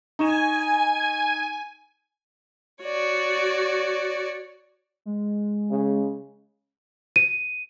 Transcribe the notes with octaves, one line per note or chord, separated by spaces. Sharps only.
D#4 G#5 C#6 E7
F#4 C#5 D5
G#3
C#3
D#7